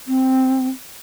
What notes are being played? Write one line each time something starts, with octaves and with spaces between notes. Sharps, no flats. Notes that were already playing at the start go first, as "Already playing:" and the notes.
C4